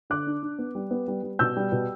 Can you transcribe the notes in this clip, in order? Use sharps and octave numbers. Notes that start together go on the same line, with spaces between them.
D3 D6 F#6
D4
D4
B3
G3
B3
G3
G3
B2 E6 G6
G3
B2